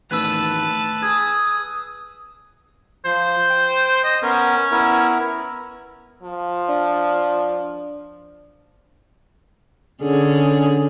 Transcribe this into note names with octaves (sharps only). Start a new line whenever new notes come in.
E2 A2 D#3 B4 A5 E6 F#6
G#4 D#6 G#6
F3 C5
G5
D#5
B3 C#4 A#4
B3 E4 A#4
F3
D4
D3 C#4 G#4